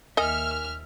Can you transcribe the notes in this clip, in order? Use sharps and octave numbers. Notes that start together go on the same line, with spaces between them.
D#2 A#4 D#5 E5 G#5 F6